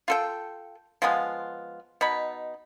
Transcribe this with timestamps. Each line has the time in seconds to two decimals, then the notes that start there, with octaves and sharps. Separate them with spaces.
0.08 F4 A4 G5
1.02 F3 G#3 B3 F4
2.01 B2 D#4 B5